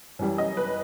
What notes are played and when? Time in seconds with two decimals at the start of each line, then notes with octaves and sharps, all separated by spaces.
0.19 F#2 E3 G3
0.38 D#5
0.57 B4